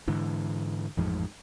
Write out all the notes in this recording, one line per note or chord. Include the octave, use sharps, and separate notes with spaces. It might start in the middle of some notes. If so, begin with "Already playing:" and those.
G#2 D3 E3
A1 F2 G#2 F3